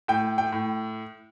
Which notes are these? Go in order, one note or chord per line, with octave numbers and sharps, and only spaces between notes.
A2 G5
G5
A2